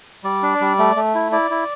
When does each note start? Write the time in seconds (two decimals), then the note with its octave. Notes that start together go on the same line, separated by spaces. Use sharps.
0.24 G3 D5
0.43 D4
0.61 G3
0.79 A3
0.96 A3
1.15 E4
1.32 E4 D5
1.51 E4